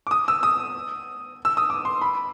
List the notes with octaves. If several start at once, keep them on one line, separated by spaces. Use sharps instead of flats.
D6
D#6
E6
D#6
E6
D#6
D6
C6
B5